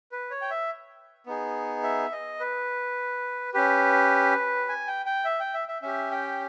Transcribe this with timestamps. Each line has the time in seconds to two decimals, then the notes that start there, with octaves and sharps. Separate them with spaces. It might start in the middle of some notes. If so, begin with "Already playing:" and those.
0.12 B4
0.31 C#5
0.42 G5
0.50 E5
1.26 B3 D#4 G#4
1.83 E5
2.12 D#5
2.40 B4
3.54 C#4 G4 B4
4.69 G#5
4.87 G5
5.06 G5
5.25 E5
5.40 G5
5.54 E5
5.68 E5
5.82 C#4 G4 E5
6.11 G5